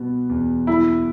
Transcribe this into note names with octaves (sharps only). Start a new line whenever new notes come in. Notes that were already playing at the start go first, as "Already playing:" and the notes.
Already playing: B2 G3 B3
E2
G3 E4